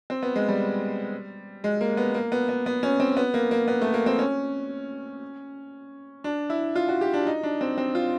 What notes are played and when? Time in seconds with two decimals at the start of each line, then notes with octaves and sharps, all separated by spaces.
0.10 C4
0.23 B3
0.35 G#3
0.48 G3
1.64 G#3
1.81 A#3
1.97 B3
2.14 A#3
2.32 B3
2.49 B3
2.66 B3
2.83 C#4
3.00 C4
3.17 B3
3.34 A#3
3.51 A#3
3.68 B3
3.82 A3
3.94 A#3
4.06 C4
4.19 C#4
6.24 D4
6.50 E4
6.75 F4
6.89 F#4
7.01 G4
7.14 D4
7.27 D#4
7.43 D4
7.61 C4
7.78 C4
7.95 F4